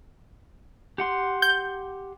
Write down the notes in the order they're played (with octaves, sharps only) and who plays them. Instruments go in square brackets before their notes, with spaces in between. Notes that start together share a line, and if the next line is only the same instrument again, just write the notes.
[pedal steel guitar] G4 F#5 C6
[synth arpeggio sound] G6